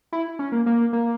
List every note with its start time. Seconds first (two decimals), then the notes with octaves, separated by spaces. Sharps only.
0.13 E4
0.39 C#4
0.52 A#3
0.66 A#3
0.93 A#3